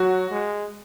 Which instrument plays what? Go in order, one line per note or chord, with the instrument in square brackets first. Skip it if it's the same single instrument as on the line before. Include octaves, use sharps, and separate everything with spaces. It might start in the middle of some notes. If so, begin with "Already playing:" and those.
Already playing: [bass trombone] F#3 [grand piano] F#4
[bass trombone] G#3